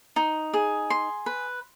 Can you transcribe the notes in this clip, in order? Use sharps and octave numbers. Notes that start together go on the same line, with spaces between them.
D#4
G#4
C6
B4